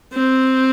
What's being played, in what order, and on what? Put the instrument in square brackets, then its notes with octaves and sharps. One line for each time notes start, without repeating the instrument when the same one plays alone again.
[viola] C4